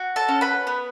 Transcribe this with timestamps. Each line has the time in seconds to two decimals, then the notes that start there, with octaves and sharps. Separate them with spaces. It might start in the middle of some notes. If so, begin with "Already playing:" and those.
Already playing: F#4
0.16 A4 A5
0.29 C#4
0.41 B4 B5
0.67 B3